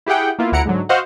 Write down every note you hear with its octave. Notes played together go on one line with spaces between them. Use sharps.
E4 G4 G#4 F#5 G5
A#3 B3 E4 F4
D2 E4 F#5 A#5 C#7 D7
G#2 D3 F#3
F#4 C5 D#5 F5 F#5